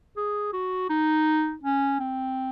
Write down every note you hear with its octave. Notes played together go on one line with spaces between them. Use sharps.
G#4
F#4
D#4
C#4
C4